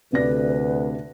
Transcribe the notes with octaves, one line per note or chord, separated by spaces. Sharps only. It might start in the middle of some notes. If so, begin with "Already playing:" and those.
D2 C3 B4 D5 A#6